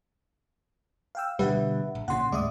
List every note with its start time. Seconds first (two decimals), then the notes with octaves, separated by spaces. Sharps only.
1.15 F5 G5 E6
1.39 B2 D3 G3 B4 E5 F#5
1.95 A#1
2.08 A#2 C#3 F#5 C6
2.32 D#1 A2 G#3 D5 E5 D#6